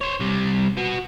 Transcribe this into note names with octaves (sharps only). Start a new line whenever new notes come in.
C5 C#5
C3 G3
B3 F#4